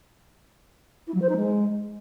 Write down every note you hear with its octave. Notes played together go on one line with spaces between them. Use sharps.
E4
F#3
C5
D#4
G#3